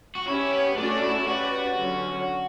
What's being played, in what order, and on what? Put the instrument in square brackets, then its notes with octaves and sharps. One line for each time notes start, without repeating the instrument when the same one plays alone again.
[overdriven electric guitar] F#4
[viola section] C#4 G4 C#5 [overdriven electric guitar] E4
[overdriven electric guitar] B3
[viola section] A3 C#4 F#4 A4 D5 [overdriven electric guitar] D4
[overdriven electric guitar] E4
[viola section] C#4 G4 B4 D5 [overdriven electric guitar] F#4
[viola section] D3 F#3 C#4